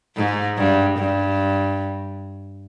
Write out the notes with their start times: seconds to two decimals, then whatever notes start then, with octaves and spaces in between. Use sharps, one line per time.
0.16 G#2
0.57 G2
0.98 G2